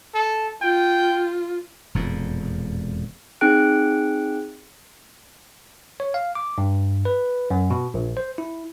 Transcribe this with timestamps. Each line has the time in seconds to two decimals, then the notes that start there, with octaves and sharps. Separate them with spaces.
0.14 A4
0.62 F4 G5
1.95 E1 F2 A#2
3.41 C4 D#4 G#4 G5 F#6 D7
6.00 C#5
6.14 F5
6.35 D6
6.58 G2
7.05 B4
7.50 F#2
7.70 B2
7.94 A#1
8.17 C5
8.38 E4